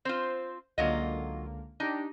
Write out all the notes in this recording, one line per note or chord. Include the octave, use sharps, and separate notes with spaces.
C4 F4 C5
C#2 D3 F#3 A#3 F4 D#5
D4 D#4 G4